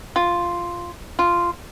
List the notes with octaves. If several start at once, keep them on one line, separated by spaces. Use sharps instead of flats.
F4
F4